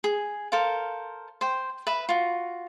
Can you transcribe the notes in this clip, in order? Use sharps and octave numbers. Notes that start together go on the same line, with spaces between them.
G#4
A4 A#4 C5 F5
C5 G5
B4 E5 B5
F4 F#4